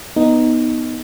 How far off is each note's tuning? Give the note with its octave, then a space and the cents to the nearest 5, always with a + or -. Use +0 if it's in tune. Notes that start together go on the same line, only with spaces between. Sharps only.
B3 +0 D#4 +0